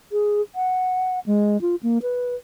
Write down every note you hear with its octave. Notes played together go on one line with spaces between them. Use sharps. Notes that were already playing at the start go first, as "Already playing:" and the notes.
G#4
F#5
G#3
F4
A#3
B4